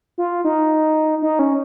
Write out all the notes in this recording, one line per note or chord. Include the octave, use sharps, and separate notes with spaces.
F4
D#4
D#4
C#4